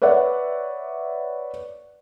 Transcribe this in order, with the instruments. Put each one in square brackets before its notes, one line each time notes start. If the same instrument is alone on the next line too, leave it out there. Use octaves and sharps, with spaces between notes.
[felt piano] B4 C#5 D5 E5 F#5